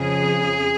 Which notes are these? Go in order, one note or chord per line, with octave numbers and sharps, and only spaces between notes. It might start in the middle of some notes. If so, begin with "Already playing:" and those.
Already playing: F2 C#3 F3 G#4